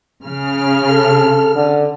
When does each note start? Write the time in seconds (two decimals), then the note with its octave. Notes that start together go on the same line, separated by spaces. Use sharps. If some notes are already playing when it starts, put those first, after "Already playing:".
0.24 C#3 F6
0.90 A4
1.55 D3